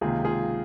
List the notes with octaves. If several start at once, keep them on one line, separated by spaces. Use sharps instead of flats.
C#2 C3 D#3 A#3 F4 G#4
F4 G#4